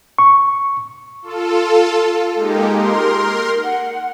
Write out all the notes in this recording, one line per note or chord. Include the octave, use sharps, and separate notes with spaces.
C#6
F4 A4
G#3 A#3 D#4 G4
A#4 C6
F#5